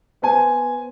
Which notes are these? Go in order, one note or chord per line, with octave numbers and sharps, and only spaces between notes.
B3 C5 G#5